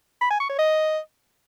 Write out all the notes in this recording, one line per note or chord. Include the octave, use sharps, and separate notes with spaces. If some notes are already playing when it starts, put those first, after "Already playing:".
B5
G#5
C#6
C#5
D#5